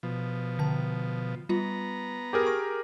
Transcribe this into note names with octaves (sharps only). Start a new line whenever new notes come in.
B2 F3
D3 A5
G3 B3 F4 A#5
G4 G#4 A#4
C#6